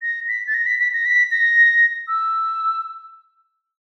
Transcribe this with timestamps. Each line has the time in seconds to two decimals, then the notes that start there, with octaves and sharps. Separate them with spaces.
0.02 A#6
0.28 B6
0.47 A6
0.54 A#6
0.66 B6
0.79 B6
0.93 A#6
1.06 B6
1.31 A#6
2.08 E6